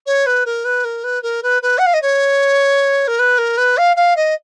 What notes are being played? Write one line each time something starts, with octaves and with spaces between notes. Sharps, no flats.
C#5
B4
A#4
B4
A#4
B4
A#4
B4
B4
F#5
F5
D#5
C#5
A#4
B4
A#4
B4
F5
F5
D#5